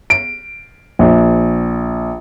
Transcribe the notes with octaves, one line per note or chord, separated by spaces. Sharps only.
D7
A#1